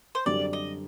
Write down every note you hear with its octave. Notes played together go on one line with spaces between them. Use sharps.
C5
F#2 D3 G3 C4 G4 D5
D#5